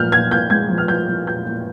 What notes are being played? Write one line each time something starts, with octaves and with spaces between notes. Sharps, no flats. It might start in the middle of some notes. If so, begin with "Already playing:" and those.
Already playing: A#2 F3 F6 G6
A#2 G#6
A#2 G6
G#3 G#6
F3
F6
F3 G6
F3
A#2 G6
A#2